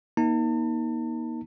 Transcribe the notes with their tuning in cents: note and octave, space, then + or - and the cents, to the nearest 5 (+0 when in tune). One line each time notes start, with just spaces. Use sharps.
A#3 +35 D#4 +25 A5 +40